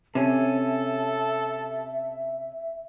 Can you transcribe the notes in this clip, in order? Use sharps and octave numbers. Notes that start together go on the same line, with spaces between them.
C3 C#4 A4 E5